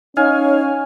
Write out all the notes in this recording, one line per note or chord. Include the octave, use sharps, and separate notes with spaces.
C#4 D#4 C#5 F5 G#5